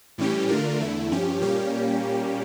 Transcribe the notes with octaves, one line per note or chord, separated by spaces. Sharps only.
A2 E3 G3 C#4 G4
D3 A3 D4 F4 A#4
E2 D3 A3 E4
G2 F3 C#4 G4
A#2 G3 A#3 C#4 G4